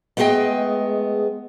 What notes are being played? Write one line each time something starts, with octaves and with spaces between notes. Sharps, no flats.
G#3 A3 B3 G#4 D#5 G5